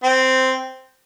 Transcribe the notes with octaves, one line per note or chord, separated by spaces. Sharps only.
C4